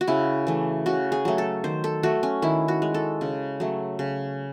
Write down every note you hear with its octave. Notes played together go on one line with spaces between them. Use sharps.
F#4
C#3 E4
E3 A3
C#3 F#4
G#4
F#3 A3
A4
D#3 C5
A4
A3 F#4
C#4
D#3 E4
F#4
G#3
A4
C#3
F#3 A3
C#3